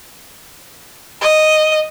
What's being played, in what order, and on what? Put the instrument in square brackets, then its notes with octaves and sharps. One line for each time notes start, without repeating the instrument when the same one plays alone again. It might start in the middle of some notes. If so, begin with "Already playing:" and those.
[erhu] D#5